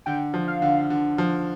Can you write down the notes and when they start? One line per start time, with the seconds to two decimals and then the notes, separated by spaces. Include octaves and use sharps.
0.06 D3 G5
0.34 F3
0.48 F5
0.62 D3
0.90 D3
1.18 F3